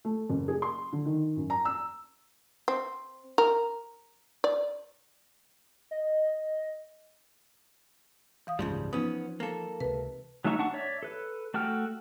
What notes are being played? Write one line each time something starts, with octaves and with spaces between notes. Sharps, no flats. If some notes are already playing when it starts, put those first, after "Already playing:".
A3
F#1
G#4
C6
D3
D#3
F#2
A#5
E6
C4
A#4
D5
D#5
E3 F5 D#6
F#1 C#2 G#2 C#3 F3 G3
F3 B3 C#4 D#4
A#3 A4
C#2 C3 B4
F#3 A3 D#4 E5 C#6
D4 F#5 A5 C#6
C#5 D5 E5
A4 B4
A3 F#4 A4 G5 F6